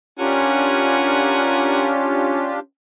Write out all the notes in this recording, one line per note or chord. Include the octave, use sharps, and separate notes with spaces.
C#4 D4 F4 G4 A#4 F#5 G#5